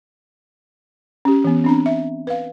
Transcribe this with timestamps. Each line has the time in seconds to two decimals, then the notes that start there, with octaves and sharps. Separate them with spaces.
1.25 C#4 G4
1.44 E3 B3
1.64 C4 D4 A#5
1.86 E5
2.27 B4 F5